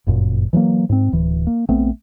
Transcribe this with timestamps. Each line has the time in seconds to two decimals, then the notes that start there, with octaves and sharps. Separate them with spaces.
0.07 G1 F#2 A#2
0.53 E3 F#3 G#3 A#3
0.89 G#2 C4
1.12 D1 E3
1.47 A#3
1.69 A#1 A3 B3 C4